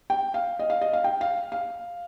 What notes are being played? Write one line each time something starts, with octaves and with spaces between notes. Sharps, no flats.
G5
F5
D#5
F5
D#5
F5
G5
F5
F5